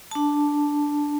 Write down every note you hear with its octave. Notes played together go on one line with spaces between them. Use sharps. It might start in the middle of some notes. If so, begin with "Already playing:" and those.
D4 A5